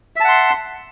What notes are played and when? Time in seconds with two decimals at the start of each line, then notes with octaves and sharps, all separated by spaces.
0.16 E5
0.20 A5
0.24 F#5
0.29 C6